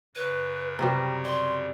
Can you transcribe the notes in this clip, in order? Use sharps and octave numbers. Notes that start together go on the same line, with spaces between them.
F#2 C#3 B4 C#5
C3 F#3 G3 A#5 A#6
D5 C6